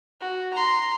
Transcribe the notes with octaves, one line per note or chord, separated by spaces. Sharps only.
F#4
A#5 C6